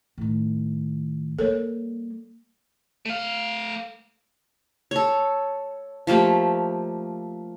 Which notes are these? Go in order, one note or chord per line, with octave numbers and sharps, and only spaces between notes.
A2 D#3
G3 A#3 A4 A#4 C#5
A3 F5
A4 C#5
F3 A3 A#3 G4